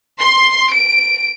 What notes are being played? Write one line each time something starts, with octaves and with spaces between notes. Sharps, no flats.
C6
D7